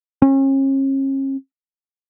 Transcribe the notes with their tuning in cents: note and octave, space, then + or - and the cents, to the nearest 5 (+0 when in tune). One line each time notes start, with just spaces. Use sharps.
C#4 -40